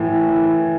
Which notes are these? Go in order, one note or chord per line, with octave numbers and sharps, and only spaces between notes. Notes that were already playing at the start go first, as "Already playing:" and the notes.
Already playing: A2 E3
E3